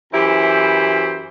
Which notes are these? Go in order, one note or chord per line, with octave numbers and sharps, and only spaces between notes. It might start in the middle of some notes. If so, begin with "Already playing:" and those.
F#2 E3 E4 G4 C5 B5